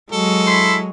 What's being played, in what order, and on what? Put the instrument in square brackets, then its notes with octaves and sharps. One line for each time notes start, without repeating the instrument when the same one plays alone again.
[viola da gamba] F#3 G#3 [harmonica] A4
[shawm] E4 [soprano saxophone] C6